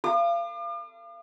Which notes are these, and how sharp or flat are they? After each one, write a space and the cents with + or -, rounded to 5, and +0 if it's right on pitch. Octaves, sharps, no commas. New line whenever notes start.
F5 -30 D6 +45